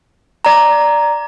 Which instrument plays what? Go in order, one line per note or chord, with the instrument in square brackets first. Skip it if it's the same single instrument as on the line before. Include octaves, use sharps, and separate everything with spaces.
[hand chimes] D5 A#5